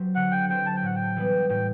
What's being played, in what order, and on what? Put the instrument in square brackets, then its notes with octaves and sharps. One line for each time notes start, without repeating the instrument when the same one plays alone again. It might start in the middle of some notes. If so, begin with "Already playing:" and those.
Already playing: [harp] F#3 C4 G4 C5
[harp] D3 [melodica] F#5
[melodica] G5
[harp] F#3 C4 G4 C5 [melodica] G5
[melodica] A5
G5
[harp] A2 [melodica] F#5
[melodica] G5
[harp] E3 G3 B3
[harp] A2 [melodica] G5